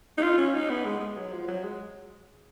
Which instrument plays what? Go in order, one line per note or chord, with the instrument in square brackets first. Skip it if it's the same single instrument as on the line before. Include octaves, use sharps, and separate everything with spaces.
[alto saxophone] D#4
F4
C#4
D#4
B3
G#3
G#3
F#3
F3
F#3
G#3